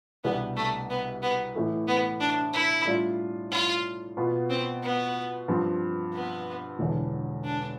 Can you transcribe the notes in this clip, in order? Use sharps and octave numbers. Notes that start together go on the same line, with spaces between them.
C2 B2 G3 B3 D4
A3
B3
B3
A2 E3 A3
B3
D4
E4
A2 G3 D4 F4
F4
B2 B3 F4 B4
C4
B3
G2 F3 C4
B3
E1 E2 D3
D4